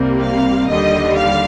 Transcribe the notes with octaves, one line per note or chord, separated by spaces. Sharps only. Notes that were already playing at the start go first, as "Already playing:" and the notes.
Already playing: C2 C3 G3 A#3
F5
D#2 D3 G3 D#5
F5